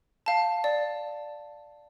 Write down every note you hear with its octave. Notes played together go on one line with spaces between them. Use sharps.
F5 A5
D5